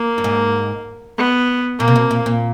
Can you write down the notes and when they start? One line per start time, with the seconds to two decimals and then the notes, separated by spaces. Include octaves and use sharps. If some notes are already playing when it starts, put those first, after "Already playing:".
Already playing: A#3
0.18 G2
0.24 G#2
1.18 B3
1.79 A#2 A#3
1.88 C3
1.96 B2
2.11 A#2
2.26 A#2